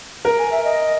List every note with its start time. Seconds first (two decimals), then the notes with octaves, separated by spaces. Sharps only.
0.25 A#4 A#5
0.39 G#5
0.52 E5
0.64 D#5